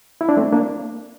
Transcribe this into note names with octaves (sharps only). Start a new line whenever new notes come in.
E4
D4
A3 C4
A#3 D4